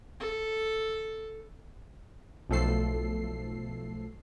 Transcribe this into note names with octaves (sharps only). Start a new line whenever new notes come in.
A4
B1 F3 A3 A4 C7